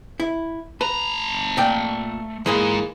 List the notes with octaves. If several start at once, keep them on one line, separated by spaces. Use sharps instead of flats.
E4
A3 B4 A#5
A#2 D5 G5
G#2 E3 G#3 A#3